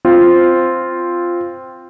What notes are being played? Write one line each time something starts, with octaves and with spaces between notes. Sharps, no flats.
C4 F4